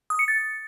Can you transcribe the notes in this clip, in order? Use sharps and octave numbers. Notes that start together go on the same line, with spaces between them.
D#6
C#7
A6